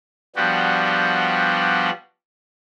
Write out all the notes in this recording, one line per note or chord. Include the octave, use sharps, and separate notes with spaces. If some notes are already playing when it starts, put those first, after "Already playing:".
F3 G3 B3 D4 F#4 G4